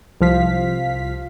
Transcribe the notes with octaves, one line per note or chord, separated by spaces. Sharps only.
C2 F3 F5 B6